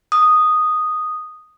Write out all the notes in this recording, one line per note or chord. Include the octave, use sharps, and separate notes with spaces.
D#6